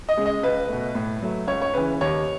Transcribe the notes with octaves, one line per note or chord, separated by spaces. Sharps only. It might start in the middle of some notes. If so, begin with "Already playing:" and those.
D#5
C#3 G#3
D#5
C#2 B4
B2 A3
A2
F#3 A3
C#2 C#5
C#5
C#3 E3 B4
D#2 C#5